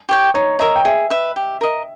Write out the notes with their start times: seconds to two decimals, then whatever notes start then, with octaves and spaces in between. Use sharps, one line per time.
0.09 G4 C#5 G5
0.34 D#4 C#5
0.59 A#4 D#5 E5 A#5
0.76 G5
0.85 G#4 E5
1.10 B4 E5
1.36 G4
1.61 A#4 D#5